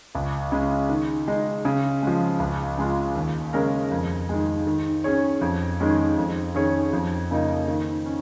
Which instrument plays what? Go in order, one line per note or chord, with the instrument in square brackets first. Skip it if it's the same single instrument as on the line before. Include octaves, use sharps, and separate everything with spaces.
[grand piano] C#2
C#3 G#3
D#3
G#3 D#4
C#3
F3 G#3
C#2
C#3 G#3 F4
D#2
C#3 G#3 C#4 A#4
F2
D#3 G#3
D#3
C#4 G#4 C#5
F2
D#3 G#3 C#4
F2
D#3 C#4 G#4 C#5
F2
C#3 A#3 D#4
D#3
C#4